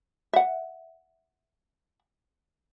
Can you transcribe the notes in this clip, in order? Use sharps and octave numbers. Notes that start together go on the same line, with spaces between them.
E5 F#5